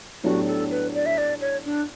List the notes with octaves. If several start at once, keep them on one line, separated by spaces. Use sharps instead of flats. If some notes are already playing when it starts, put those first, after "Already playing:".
A2 F#3 B3 D4 F#4 G4
A4
B4
D5
E5
D5
C#5
D4